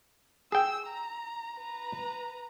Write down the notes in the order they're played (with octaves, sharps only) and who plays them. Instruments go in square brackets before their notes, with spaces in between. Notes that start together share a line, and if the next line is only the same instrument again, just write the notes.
[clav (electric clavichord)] G#4 G5 [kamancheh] E6
[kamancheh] A#5
B4 A#5